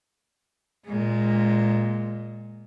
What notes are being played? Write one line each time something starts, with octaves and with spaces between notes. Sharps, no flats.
A#2 G#3